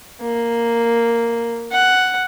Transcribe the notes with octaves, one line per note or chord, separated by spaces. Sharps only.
A#3
F#5